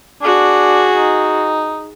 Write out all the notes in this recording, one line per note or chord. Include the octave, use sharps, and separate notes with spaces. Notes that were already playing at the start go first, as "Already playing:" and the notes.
D4 F#4 G#4
D#4